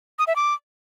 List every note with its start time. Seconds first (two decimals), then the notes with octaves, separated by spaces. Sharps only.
0.19 D#6
0.27 E5
0.36 D6